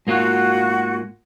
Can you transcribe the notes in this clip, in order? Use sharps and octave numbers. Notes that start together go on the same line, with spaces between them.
G#2 A#3 F4 F#4